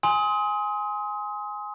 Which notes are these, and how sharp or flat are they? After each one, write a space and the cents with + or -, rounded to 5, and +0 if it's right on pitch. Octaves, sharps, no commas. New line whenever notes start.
G#5 +0 C6 +0 D#6 +30